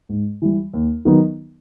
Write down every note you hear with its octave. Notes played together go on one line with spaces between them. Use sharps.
G#2
E3 G3
D#2
D#3 F#3 B3 D#4